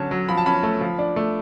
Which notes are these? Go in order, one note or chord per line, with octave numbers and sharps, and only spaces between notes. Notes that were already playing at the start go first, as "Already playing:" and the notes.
Already playing: D3 F#3 C#4 A5
F#3
F3 B5
A5
C#4 B5
A3
F3
D4
A3